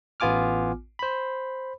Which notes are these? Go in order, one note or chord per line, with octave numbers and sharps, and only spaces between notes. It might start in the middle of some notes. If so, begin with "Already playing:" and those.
A1 B3 F4 G#5 D6 F6
C5 B5